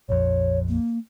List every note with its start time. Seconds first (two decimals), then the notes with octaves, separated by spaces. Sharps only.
0.09 A#1 F2 C#5
0.68 A#3